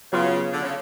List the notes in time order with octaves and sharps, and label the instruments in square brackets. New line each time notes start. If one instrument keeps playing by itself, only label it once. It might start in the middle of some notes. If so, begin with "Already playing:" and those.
[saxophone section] C#3 [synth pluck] F#3 B3 F4
[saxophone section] D3
C#3